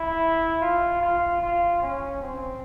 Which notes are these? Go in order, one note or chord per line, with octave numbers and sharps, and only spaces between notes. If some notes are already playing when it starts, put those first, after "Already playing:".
Already playing: E4
F4
F4
F4
C#4
C4